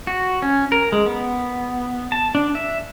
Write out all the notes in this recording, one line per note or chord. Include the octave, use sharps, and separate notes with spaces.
F#4
C#4
A#4
G#3
B3
A5
D4
E5